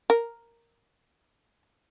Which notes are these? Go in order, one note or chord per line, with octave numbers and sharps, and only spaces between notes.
A#4